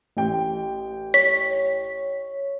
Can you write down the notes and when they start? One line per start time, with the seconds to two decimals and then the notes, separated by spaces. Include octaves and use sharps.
0.17 A1 G5
1.14 C#5 B6